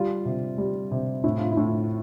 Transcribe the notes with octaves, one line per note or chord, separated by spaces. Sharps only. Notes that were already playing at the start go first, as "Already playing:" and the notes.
Already playing: G3 F4
C3
G3
C3
A2 E4
F4
E4
A2